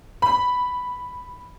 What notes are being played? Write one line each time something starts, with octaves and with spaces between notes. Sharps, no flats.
B5